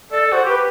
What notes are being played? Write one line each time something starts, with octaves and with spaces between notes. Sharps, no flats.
A4 D5
F#4 C5
G4 B4